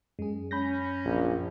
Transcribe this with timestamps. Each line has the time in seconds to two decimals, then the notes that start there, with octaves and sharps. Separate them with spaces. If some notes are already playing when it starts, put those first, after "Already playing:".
0.19 F#2 G#3 G#4
0.51 C#4 B5 G6 A#6
1.05 A#1